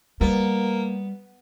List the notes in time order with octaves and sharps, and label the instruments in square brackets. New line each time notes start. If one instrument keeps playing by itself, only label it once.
[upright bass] G3 [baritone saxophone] A#3 [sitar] B3